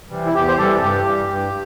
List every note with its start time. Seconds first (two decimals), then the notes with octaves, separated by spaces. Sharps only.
0.09 C3 E3 G3
0.26 E4
0.34 E2 G4
0.48 C5
0.58 C3 E3 G3 A4
0.76 A4
0.81 G2 G4
1.05 E3 G3
1.29 G2